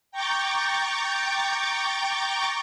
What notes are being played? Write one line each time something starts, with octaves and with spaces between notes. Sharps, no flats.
G5 A#5 C#6 D6 G6 A6